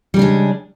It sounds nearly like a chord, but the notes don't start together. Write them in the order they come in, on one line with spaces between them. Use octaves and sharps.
G3 C#3 D4 G#3